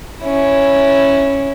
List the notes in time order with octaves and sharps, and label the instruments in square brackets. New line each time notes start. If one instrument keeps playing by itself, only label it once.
[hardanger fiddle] C#4 E4